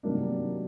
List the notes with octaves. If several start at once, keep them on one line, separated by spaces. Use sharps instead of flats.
C3 D#3 F#3 A#3 D4